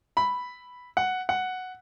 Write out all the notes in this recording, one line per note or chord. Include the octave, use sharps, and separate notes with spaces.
B5
F#5
F#5